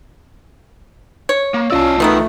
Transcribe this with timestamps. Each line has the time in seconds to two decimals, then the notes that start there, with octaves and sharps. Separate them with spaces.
1.29 C#5
1.54 A#3
1.70 C2 C#4 F4 D5 D#5 A5 E6
2.00 B2 D#3 E3 A3 B3 D#4